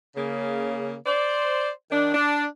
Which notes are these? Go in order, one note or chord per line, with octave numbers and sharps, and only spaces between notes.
C#3 A#3
C5 D5
D#3 D4
D4